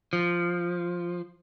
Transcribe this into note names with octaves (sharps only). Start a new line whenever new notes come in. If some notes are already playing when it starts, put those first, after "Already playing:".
F3